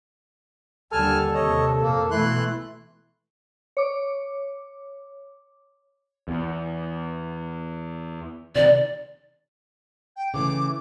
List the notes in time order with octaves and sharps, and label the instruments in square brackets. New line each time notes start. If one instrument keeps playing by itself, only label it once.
[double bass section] D#2 D3 G3 [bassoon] A4 [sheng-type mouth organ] G#5 A5 F6
[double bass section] D#2 C3 [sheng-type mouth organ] C#5 D#5
[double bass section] F2 A#2 [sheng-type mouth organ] A#3
[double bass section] B2 E3 A3 [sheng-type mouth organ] E4 C6 F#6
[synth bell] C#5 D6
[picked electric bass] E2
[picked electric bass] C3 D#3 [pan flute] D5
[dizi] G5
[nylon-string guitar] C#3 E3 A3 [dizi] D6